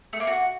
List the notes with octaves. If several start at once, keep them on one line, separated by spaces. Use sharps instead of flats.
A3
A#3
F#4